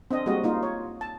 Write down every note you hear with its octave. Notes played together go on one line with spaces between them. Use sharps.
C4 D4 D#5
G3 G#3 A#3 C4 F#4 D#5
A#3 D#4 F4
C#5
A5